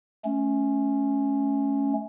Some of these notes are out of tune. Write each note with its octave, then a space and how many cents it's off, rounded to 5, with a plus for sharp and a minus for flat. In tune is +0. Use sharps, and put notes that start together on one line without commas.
A3 -25 C#4 +0